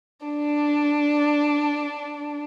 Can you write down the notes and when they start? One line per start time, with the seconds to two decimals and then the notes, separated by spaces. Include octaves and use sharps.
0.25 D4